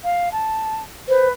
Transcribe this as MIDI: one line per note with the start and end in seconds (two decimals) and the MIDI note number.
0.04 0.29 77
0.32 0.80 81
1.08 1.32 71
1.08 1.27 72